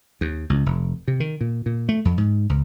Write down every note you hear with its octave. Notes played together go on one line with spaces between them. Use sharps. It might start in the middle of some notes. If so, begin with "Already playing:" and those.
D#2
C#2
F1
C3
D#3
A#2
A#2
A3
F2
G#2
C#2